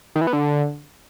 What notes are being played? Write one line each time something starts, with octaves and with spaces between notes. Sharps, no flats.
D#3
E3
B3
D3